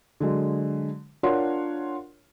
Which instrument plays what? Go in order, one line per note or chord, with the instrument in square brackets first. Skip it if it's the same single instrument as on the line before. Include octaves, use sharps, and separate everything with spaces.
[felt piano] D3 F#3 G#3
D4 F4 A#4 C#5 F#5 C6